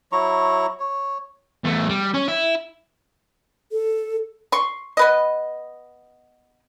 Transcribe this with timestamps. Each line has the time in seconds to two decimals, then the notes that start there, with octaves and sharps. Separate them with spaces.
0.12 F#3 E4 A#5 C#6
0.80 C#5
1.65 E2 A3
1.89 G3
2.14 C#4
2.28 E4
3.72 A4
4.52 C6 C#6
4.97 B3 B4 D#5